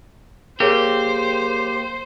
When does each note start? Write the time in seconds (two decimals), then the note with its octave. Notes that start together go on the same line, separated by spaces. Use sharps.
0.60 A#3 G4 G#4 A#4 C5 C#5